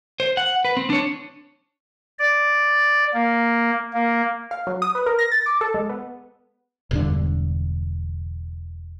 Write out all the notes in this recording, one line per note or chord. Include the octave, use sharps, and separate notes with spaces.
C5
F#5
B4
C4
D4 C#5
D5
A#3
A#3
F5
F#3
D#6
B4
A#4
A#6
A6
D6
A4
G#3
B3
E1 G2 D3